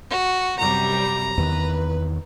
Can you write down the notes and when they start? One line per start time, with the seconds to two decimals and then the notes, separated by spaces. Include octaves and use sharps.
0.10 F#4
0.59 F#2 C3 G3 A#5
1.38 E2 D#3 B4